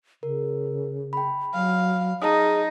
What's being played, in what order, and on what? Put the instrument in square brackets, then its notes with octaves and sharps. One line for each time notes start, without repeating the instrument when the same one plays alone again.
[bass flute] C#3 [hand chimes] A#4
[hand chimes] G5 B5
[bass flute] F#3 [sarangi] F5
[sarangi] D#4 [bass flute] G#4 [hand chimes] A5 D#6